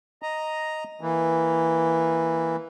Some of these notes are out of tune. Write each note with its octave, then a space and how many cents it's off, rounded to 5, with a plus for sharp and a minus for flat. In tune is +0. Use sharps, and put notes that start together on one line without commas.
D#5 +0 A#5 +0
E3 +0 A#3 +0